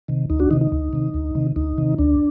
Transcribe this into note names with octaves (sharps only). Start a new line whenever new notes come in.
C3 D#3
D2 D#4
D4 F#4
C3 D#3 D#4
D#4
D2
C3 D#3
D2
C3 D#3
D2 D#4
C3 D#3
D2 D4